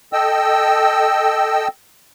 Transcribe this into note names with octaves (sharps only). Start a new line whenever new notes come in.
A4 D#5 G5 E6